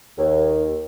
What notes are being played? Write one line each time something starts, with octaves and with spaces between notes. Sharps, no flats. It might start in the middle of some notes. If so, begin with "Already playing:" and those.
D#2